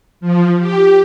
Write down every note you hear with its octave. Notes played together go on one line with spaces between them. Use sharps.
F3
G4